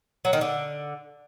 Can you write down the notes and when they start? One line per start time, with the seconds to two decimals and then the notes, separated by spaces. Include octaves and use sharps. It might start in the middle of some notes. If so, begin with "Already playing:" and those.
0.25 F#3
0.33 D#3
0.41 D3